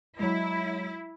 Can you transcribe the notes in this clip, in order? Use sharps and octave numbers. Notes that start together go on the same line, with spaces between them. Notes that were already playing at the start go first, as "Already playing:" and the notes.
F#3 G#3 E4